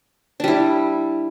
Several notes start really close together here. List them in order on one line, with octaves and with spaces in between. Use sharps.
D4 G3 E4